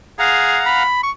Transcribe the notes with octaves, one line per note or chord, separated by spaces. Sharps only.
G#4 F5 F#5 A#5
B5
C#6